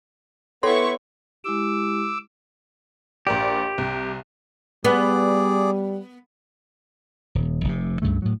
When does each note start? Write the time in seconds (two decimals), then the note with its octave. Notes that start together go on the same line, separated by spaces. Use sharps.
0.63 B3 E4 A4 C#5 C6 C#6
1.44 G#3 E4 G4 D6 E6
3.27 A#1 G4 A#4 D5
3.78 C2
4.85 G3 B3 G#4 D5
7.35 D#1
7.64 F1 C3
8.02 C#2 G2 C#3 A3
8.22 A2 F#3